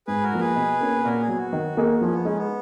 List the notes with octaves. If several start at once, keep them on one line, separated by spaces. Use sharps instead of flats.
G#2 G#4 B4
F#4 A#4
F3 A#3 D#4
G#4 B4
B2
A#3 C#4
A#2 F#4 A#4
G#4
F#3 B3
F#4
D#3
A#3 D#4 G#4
F3 C#4
B3
G#3 C#4 D#4
B3